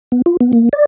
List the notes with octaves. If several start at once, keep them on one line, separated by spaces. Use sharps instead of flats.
B3
F4
B3
A#3
D5